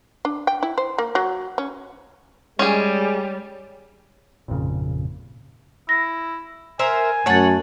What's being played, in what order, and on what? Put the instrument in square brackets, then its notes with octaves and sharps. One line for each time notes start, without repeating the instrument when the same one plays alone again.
[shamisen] D4
G5
E4
C5
A#3
F#3
C#4
[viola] G3 [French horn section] G#3 [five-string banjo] C#4 G#4
[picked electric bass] G#1 F2 A#2 C#3
[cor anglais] E4 [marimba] A#6
[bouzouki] A#4 C5 E5 [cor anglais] G#5
[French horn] F#2 [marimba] A3 G#6 A6 [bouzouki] C#5 F#5